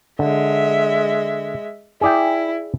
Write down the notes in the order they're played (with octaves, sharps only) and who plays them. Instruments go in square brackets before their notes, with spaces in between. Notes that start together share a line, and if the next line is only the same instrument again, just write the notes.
[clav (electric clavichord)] D3 [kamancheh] G#3 E5
[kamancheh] E4 [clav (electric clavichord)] G#4 D5 G5